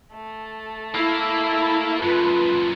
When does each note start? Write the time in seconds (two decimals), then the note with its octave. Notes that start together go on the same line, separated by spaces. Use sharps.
0.14 A3 A4
0.95 A#3 E4
2.02 F#2 A#2 F4 B4